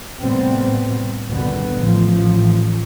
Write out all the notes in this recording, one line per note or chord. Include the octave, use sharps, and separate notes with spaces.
A2 C3 G3 B3 C4
G#1 C#2 B2 D3 G3 B3
A1 A2 F3